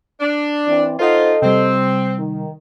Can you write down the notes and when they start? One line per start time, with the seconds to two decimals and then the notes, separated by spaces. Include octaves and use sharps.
0.20 D4
0.67 E3 C4 D5
1.00 D#4 F4 A4 C5 D#5 F#5
1.42 C3 G3 C4
2.18 D#3